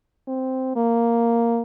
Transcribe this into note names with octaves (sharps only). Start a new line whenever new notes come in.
C4
A#3